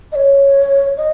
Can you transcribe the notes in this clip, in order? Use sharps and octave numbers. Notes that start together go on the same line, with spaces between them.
D#5
C#5
D#5